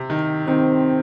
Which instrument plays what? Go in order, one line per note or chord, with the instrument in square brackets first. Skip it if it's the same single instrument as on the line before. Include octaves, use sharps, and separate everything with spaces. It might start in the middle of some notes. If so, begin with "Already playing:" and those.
Already playing: [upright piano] C3
D#3
[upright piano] D#3 [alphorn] C4